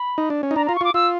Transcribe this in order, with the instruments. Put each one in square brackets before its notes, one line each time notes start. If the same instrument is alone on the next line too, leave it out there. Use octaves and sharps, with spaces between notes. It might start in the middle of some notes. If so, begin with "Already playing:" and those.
Already playing: [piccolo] B5
[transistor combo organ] D#4
D4
C#4
D#4
[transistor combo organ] D4 [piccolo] A#5
[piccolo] A#5
[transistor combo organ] F4
[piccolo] C#6
[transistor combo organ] F4 [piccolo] D6
[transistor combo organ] F4 [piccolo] E6